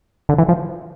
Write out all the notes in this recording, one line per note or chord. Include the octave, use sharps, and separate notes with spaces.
D3
E3
F3